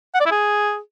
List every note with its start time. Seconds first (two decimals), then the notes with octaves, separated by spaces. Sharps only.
0.15 F#5
0.20 D5
0.26 E4
0.31 G#4